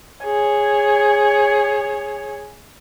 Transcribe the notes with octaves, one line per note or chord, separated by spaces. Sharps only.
G#4 C#5